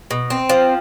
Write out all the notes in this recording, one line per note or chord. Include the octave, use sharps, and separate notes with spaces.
B2
C4
F3